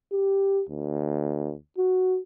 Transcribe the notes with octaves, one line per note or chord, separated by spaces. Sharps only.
G4
D2
F#4